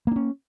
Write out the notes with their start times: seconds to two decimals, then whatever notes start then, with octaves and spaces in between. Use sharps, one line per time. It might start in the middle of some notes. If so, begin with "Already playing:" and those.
0.07 A#3
0.12 D4
0.16 C#4